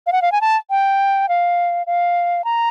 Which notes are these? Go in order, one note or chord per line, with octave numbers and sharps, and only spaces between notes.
F5
F#5
F5
G#5
A5
G5
F5
F5
A#5